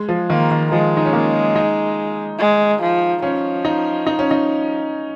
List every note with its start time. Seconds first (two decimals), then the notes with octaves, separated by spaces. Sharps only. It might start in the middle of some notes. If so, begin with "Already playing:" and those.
Already playing: G#3
0.08 F3
0.30 D#3 A#3
0.51 D#3
0.71 F3 G#3
0.97 D#4
1.06 C#4
1.13 A#3
1.56 D#4
2.39 G#3
2.81 F3
3.22 F3 C#4
3.65 D#4
4.06 D#4
4.19 C#4
4.31 D#4